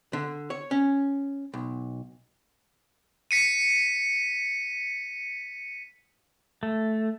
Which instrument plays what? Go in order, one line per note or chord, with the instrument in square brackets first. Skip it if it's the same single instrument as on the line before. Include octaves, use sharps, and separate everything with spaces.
[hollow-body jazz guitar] D3
C#5
C#4
B1
[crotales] B6 C#7 D#7
[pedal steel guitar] A3